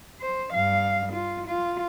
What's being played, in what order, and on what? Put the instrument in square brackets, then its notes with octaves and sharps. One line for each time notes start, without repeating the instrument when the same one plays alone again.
[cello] C5
G2 F5
F4
F4